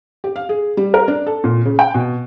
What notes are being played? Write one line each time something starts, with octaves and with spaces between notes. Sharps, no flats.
G4
F5
G#4
G3
A#4
D4
A4
A#2
C#3
G5
B2